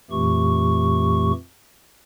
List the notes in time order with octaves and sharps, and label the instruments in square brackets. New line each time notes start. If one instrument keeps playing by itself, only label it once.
[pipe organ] F2 A#2 E3 A3 G4 C#6